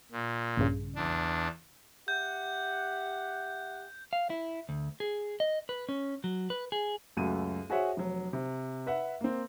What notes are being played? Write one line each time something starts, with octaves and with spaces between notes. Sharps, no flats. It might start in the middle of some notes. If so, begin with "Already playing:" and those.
A#2
A#1 G2 C#3
E2 D4
G4 E5 F#5 G6
F5
E4
D2
G#4
D#5
B4
C#4
F#3
B4
G#4
C#2 F#2 A3 F#4 D#7
F#4 G#4 C5 C#5 E5 F#5
F1 F#3
C3
B4 E5 F#5
A#3 C4